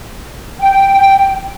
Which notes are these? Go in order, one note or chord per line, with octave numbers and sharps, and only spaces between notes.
G5